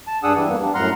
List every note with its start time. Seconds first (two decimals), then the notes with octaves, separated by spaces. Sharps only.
0.08 A5
0.23 G2 D4 G#4 F#5 D#6 E6
0.35 E3 G3 D4
0.48 F2 A#3 B3
0.61 G3 D4
0.75 F#2 A2 F#5 A#5 C6 F6